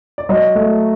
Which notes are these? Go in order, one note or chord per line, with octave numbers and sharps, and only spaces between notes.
D5
F#3 D#5
A3